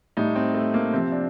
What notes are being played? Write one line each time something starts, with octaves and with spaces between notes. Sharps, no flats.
A2 G3 D#4
C4
A3
A#3
C3 F3 C4
D4